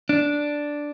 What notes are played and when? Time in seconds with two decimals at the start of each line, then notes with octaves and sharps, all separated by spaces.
0.09 D4